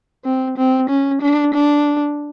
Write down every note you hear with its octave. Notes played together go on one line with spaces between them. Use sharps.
C4
C4
C#4
D4
D4